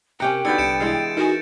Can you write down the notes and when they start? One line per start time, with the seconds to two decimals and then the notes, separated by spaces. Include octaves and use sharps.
0.20 C3 C#4 G4 A#4 F#5 G5
0.45 D3 B3 D#4 F#4 B4 G6 A6 C#7
0.58 C2 C#7 D7 E7
0.80 E3 G#3 F5
1.17 D#4 F#4 G#4 A#4